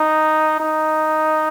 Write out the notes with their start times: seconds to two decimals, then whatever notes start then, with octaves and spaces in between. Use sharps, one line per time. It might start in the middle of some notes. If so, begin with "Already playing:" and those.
Already playing: D#4
0.60 D#4